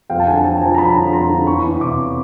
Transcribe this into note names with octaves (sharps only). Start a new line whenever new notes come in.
F2 F5 G5
A5
D3 F#5 G#5
F3 G5 A5
A5
F3 G#5 A#5
A#5
F3 A5 B5
D3
F2 A#5 C6
D3
E2 B5 C#6
E2
C3 C6 D6